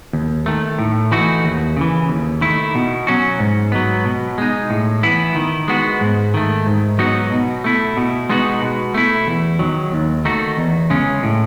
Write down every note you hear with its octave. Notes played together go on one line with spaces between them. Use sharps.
D#2
D#3 A3
A2
E3 A3 D#4 F#4
D#2
C#3 E3
D#2
D#3 A3 E4
B2
F#3 C#4 F#4
G#2
F#3 B3
B2
G#3 D#4
A2
E3 B3 E4
D#3
G#3 B3 F#4
G#2
D#3 A3
G#2
F#3 B3 D#4 F#4
B2
A3 E4
B2
G#3 B3 D#4 F#4
B2
A3 E4
E2
D#3 F#3
D#2
D#3 A3 D#4 F#4
E2
C#3 G#3 C#4
A2